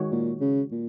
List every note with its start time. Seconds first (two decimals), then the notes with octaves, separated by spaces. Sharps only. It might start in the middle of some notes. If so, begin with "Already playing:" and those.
Already playing: D#3 G#3 F#4 C#5
0.12 A#2
0.41 C#3
0.71 A#2